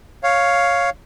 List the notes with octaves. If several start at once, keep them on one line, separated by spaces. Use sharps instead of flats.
C#5 F5